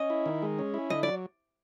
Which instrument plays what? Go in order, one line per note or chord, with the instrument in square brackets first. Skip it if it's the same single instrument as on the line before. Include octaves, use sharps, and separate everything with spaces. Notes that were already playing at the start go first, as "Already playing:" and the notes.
Already playing: [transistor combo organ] C#4 [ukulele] D#5
[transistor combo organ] E4
D#3
G#3
C#4
E4
[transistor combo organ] D3 [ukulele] D#5
[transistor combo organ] F#3 [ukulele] D5